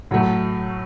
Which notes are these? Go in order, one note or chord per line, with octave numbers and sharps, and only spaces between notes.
A2 F#3 A3